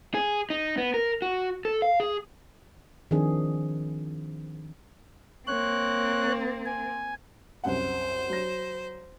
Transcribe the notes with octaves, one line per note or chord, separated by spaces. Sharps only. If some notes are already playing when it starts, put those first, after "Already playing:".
G#4
D#4
B3
A#4
F#4
A4
F5
G#4
D#3 F3 C4 D4 G#4
A#3 C4 C#5 F#6
G#5
C2 F#2 C5 F#5
F#3 A#6